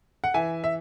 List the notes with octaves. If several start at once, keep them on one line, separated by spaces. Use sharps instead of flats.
F#5
E3 E5 G#5
E5